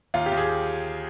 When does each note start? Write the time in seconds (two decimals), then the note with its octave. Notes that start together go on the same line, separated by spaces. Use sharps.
0.14 D#2 F4
0.26 G4
0.32 D#2
0.37 G#4